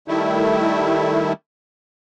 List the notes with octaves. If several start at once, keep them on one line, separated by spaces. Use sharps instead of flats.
D#3 G3 A3 E4